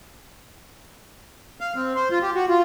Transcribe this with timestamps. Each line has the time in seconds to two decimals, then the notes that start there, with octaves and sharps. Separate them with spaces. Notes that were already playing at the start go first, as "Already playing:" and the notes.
1.61 F5
1.76 C4
1.95 C5
2.11 F4
2.22 G4
2.35 F#4
2.49 F4